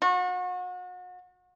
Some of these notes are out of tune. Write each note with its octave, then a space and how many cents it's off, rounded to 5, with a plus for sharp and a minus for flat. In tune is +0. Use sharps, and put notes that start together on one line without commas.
F#4 -35